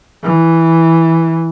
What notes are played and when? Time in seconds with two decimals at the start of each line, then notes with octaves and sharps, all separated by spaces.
0.23 E3